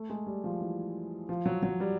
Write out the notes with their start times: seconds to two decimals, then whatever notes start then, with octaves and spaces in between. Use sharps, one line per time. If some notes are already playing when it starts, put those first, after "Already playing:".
Already playing: A3
0.10 G#3
0.27 G3
0.44 F3
0.61 E3
1.29 F3
1.46 F#3
1.63 F#3
1.80 G3